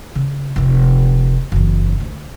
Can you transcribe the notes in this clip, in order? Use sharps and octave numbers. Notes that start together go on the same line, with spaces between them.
C#3
F1 D#4
F#1 E2
D2